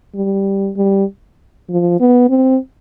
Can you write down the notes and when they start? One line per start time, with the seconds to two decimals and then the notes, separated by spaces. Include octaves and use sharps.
0.15 G3
0.77 G3
1.70 F3
2.00 B3
2.30 C4